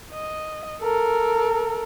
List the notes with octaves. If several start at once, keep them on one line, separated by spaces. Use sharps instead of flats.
D#5
A4 A#4